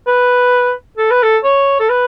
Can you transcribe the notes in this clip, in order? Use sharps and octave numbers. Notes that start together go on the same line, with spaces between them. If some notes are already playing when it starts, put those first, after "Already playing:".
B4
A4
B4
A4
C#5
A4
B4